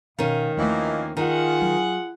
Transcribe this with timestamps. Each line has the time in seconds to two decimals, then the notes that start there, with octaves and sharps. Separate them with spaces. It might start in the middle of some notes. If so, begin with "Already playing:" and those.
0.19 B2 D#3 C#4 F5
0.57 D#2 E3 F3 A3 A#3 D#5
1.17 D#3 F4 G#4 F#5
1.61 F#3